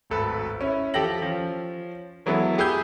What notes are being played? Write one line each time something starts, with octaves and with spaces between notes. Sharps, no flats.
D1 G#1 A4 B4
C#4 E4
F3 G4 A4 G5 A#6 F#7
F3 C#4
E3 F#3 G#3 B3 E4 A4
G4 G#4 B4 D#6 E6 G6